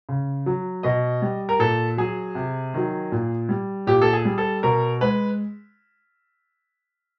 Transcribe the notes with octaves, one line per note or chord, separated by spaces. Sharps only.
C#3
F#3
B2 D#5
G3
A#4
A#2 A4
F#3 G#4
C3
D#3 F#3
A#2
G3
A#2 G4
A4
G#4
G3
A4
B2 A#4
G#3 B4